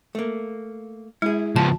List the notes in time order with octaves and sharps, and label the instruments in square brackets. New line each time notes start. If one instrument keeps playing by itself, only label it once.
[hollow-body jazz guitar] A3 A#3
[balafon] G#3 [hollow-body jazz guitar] E4 G#4
[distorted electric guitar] C#2 F3 [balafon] A5